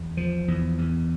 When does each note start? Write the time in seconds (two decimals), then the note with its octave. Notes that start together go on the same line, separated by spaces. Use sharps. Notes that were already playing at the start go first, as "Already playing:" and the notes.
Already playing: E2
0.17 F3
0.48 E2
0.78 E2